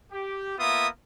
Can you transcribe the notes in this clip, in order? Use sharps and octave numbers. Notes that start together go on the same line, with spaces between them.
G4
A#3 B3 F4 E5 D#6